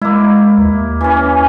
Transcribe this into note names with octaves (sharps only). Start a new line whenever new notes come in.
G#3 A#3 E4
D#2
E3 C#4